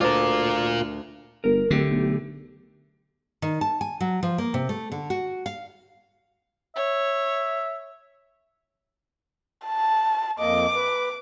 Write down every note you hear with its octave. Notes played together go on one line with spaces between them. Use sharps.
D2 F4 A#4 D5
G1 A#4
D1 D3 A3 G4
B1
D#3
A5
G#5
F#3
F3
A#3
C3
A3
D3
F#4
F5
C#5 E5
A5
F2 A#3 D#5 D6
B4